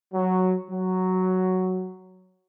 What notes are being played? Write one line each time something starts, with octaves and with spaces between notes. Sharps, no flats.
F#3
F#3